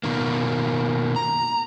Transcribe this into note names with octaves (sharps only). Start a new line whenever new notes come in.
B2 D#3 A#3
A#5